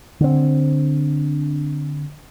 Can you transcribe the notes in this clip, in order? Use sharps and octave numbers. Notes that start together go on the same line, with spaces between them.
D3 C4